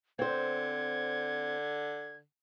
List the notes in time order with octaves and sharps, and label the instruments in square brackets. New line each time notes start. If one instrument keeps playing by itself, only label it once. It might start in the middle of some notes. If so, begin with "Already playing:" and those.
[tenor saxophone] D3 [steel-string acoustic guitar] C4 C5 [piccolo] G#6